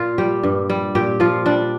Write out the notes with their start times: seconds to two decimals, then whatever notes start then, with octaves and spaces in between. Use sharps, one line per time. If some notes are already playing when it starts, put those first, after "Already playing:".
Already playing: A#2 F4
0.18 G3 G4
0.43 G2
0.70 G3
0.95 A#2 G4
1.20 F3 F4
1.46 G3 D4